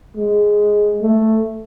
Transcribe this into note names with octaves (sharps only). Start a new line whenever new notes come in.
G#3
A3